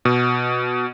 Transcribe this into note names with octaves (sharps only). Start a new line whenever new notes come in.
B2